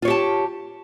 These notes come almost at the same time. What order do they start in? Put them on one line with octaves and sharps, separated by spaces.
F4 C#5 G4 A5